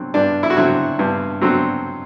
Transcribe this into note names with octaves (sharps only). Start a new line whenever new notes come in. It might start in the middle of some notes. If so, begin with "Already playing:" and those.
Already playing: D3 F#3 C4
G2 D4
E4
F#4
D3 F#3 C4 E4
G2
D3 F#3 C4